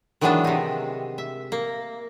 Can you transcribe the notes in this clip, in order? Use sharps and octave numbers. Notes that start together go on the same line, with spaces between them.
D#3 E3 F#3 G#3 B3 D4
C3 D#4
E5
A#3